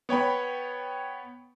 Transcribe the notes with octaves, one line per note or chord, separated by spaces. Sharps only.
B3 C#5 G5 B5